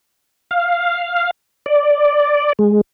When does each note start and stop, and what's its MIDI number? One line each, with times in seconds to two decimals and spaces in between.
0.51 1.31 77
1.66 2.53 74
2.59 2.81 56